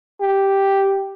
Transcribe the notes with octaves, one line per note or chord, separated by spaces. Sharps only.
G4